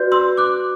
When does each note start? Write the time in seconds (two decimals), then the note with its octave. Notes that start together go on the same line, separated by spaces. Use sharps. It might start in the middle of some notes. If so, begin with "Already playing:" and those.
Already playing: F#4 B4 D5 G6
0.12 C6 E6
0.37 D6 F#6